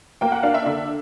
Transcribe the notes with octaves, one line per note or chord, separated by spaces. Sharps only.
A#3 G5
F#5
D4 F5
E5
D3 E5